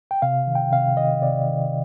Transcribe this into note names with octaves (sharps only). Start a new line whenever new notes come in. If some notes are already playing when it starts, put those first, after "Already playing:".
G5
C3 F5
D#3
G5
C3 F5
D#3 D#5
C3 D5
D#3